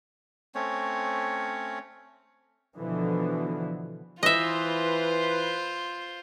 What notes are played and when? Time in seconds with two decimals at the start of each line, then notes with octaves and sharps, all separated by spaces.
0.55 A3 C4 C#4 C#5
2.77 B2 D3 E3 F3 B3
4.23 E3 F4 B4 C5 D#5 E5